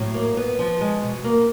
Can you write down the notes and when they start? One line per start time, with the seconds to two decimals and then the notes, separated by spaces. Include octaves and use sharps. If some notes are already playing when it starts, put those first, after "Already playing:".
Already playing: A2 F#3
0.14 A#3
0.37 B3
0.59 F3
0.81 G#3
1.02 B2
1.24 A#3